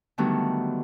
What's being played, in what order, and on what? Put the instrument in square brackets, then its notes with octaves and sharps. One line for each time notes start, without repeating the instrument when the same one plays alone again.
[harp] D3 D#3 F#3 G3 A3 B3